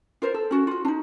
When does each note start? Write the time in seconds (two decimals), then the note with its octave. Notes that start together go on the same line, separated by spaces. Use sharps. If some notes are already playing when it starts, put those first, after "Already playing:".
0.22 F4 A#4 C5
0.34 A4
0.51 C#4 F#4
0.67 F4 F#4
0.85 D4 D#4